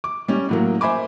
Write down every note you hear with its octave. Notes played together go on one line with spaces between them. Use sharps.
D6
G3 C#4
A2 F#3 A#3
C5 E5 G#5 B5 D6